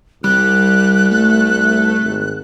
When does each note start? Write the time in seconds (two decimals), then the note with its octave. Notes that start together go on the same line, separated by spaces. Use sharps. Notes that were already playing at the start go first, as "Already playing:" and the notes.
0.24 C2 G3 F#6
1.11 A3
2.03 G#1